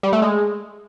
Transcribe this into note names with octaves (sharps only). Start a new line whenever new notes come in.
G3
A3
G#3